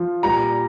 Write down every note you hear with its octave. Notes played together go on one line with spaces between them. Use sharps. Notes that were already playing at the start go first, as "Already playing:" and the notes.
Already playing: F3
A#2 G3 A#5